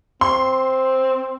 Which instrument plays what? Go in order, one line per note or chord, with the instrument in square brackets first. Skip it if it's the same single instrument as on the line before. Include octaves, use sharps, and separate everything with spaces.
[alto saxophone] C4 [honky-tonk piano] C6